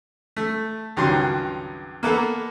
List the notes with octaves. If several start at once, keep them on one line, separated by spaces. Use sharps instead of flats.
A3
C#2 G2 D#3 F#3 C6
A#3 B3 A4